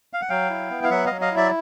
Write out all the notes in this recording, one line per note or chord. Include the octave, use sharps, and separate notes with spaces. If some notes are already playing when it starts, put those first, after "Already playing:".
F5
F#5
F#3 F5 G5
E4
B3
F5
F#3 E5 F#5
F#3 D#5 F5
D#5 F5
E4
D5 E5